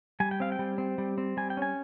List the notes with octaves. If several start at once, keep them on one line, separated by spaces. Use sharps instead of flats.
G3 G#5
G5
C4 F5
G5
G3
C4
G3
C4
G3 G#5
G5
C#4 G#5